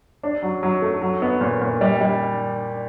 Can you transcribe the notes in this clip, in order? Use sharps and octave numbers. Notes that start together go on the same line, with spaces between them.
D4
F#3
F#3
A3
F#3
B3
A#2
A#2
G3
G3